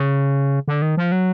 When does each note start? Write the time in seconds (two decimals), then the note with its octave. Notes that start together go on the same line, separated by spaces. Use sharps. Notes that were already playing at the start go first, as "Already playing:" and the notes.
Already playing: C#3
0.68 D3
0.82 D#3
0.97 F3
1.12 F#3